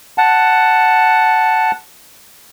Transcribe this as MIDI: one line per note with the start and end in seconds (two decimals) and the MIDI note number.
0.18 1.71 78
0.18 1.71 81